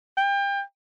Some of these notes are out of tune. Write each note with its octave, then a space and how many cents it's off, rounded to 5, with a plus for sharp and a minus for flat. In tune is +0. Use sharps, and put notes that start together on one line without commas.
G5 +30